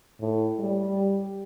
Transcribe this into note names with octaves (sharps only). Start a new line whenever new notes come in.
A2
G3